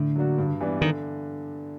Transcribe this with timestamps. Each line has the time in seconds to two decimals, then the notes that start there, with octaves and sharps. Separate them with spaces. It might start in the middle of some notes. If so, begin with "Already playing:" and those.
Already playing: A2 D3
0.16 F#3 A#3 D4 F#4
0.38 G2
0.61 E3 G3 B3 D4
0.81 D3 D#3